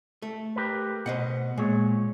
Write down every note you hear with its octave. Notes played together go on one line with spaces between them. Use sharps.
A3
G4 A#4 B4
B2 C5 D#5 F#5
A#2 G#3 C#5